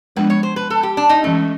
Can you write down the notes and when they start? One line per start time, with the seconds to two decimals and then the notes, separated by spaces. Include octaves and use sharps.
0.16 F3 G#3 B3 D4 B4
0.30 C#5
0.43 C5
0.56 B4
0.70 A4
0.83 G4
0.97 D4
1.09 D#4
1.23 E3 G#3 A3 C#4